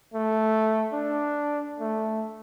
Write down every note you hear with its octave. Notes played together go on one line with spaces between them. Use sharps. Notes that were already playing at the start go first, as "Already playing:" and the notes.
A3
D4
A3